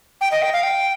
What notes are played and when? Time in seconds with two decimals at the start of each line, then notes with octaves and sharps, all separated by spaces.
0.21 G5
0.32 D#5
0.42 G5
0.53 F5
0.64 G5